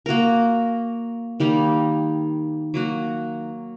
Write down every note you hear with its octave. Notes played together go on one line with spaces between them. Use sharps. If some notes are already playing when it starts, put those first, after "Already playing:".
A#3 F#4 A#4
D#3 G3 A#3 D#4
F#3 A#3 F#4